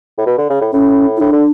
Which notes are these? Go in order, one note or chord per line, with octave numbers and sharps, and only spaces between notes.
A2
B2
D3
C#3
A2
A2 C#4
E4
A2 D4
D3